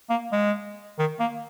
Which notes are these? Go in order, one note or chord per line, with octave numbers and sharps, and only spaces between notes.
A#3
G#3
D#3
A#3